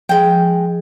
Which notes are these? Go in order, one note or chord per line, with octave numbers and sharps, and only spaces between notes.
F3 G#3 G5